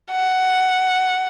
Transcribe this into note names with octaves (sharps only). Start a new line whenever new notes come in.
F#5